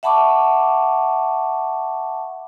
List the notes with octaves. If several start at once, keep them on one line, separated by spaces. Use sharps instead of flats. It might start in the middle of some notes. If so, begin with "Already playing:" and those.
E5 F#5 A5 B5 C#6 D6